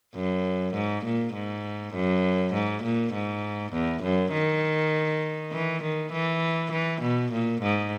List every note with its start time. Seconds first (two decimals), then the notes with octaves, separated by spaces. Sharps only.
0.15 F#2
0.74 G#2
1.05 A#2
1.34 G#2
1.94 F#2
2.54 G#2
2.84 A#2
3.13 G#2
3.73 E2
4.03 F#2
4.32 D#3
5.53 E3
5.83 D#3
6.12 E3
6.72 E3
7.02 B2
7.32 A#2
7.62 G#2